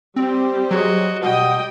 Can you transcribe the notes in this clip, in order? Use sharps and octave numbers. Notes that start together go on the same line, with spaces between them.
G3 C4 G4 C5
F#3 F#4 G#4 D#5
B2 G3 D#5 F#5 G5 D#6